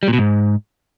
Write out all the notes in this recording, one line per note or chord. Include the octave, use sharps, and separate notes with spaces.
G3
A#2
B2
G#2